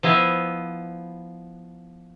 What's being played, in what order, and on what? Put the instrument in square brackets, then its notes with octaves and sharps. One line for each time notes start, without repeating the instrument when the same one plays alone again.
[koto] F3 B3 E4 D#5 F5